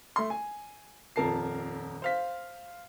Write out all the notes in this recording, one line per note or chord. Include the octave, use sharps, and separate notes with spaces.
A3 C6
G#5
D#1 F2 A#4 A5 C7
C5 F5 B6